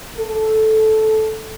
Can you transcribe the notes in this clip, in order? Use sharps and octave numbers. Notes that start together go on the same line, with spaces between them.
A4